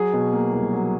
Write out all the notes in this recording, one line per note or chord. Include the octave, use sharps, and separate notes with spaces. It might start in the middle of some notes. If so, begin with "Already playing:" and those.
Already playing: F#3 G#4
B2
A#3
C2
F#3